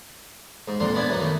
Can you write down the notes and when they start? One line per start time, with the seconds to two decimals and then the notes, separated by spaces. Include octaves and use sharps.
0.68 G#2
0.80 F2 A#2 D4 C6
0.94 B3 D4 D5 E5 G#5 D6
1.09 F#2 B3 D#4
1.21 D#3 A3